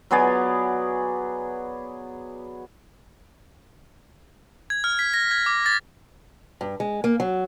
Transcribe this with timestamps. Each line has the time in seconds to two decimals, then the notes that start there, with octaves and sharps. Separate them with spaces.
0.11 F#3 B3 G#4 D5
4.70 G#6
4.84 F6
4.99 B6
5.14 A#6
5.31 G#6
5.46 D6
5.66 A6
6.61 G2
6.80 G#3
7.04 A#3
7.20 F#3